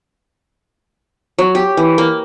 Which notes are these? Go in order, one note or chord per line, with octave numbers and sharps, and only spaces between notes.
F#3
G4
E3
A#3